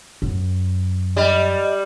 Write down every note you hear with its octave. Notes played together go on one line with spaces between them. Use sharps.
F#2
G3 D#5